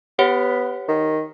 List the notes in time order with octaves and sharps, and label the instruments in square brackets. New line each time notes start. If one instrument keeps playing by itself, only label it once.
[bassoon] B3 [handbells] G4 C#5 F#5
[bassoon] D#3